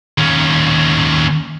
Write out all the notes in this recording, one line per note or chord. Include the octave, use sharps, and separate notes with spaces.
D#2 C#4